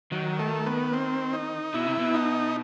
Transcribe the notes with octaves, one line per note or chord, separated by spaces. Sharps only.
D#3 F#3
A3
B3
C4
D#4
B2 E4
C3
B2
D#4